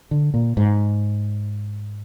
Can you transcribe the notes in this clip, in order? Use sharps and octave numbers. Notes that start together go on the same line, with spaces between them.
D3
A#2
G#2